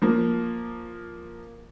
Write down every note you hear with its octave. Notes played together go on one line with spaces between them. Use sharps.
F3 A#3